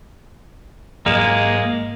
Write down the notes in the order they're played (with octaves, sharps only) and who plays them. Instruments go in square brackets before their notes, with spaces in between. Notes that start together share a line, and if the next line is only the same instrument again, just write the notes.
[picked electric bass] G#2 F#3 [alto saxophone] G#3 [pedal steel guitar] A#3